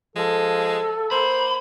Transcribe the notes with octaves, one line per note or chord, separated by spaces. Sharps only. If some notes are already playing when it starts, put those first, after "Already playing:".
F3 G#3 A4
A#3 C5 B5